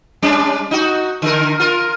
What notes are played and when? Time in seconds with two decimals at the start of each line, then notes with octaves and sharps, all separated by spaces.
0.22 G3 C#4 D4
0.71 D#4 F#4
1.22 D3 A#4
1.60 F4 A#4